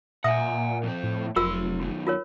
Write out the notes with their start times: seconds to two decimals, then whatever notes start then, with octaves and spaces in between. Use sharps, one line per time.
0.24 A#2 E5 F#5 G#5 D#6
0.83 F2 C4
1.03 A2
1.36 F1 F#3 F4 A#4 C6 E6
1.81 F#2 D#3
2.07 F4 A#4 C#5